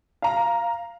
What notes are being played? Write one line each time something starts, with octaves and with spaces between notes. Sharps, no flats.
F5 A#5